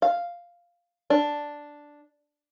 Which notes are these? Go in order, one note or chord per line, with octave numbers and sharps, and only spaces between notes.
F5
D4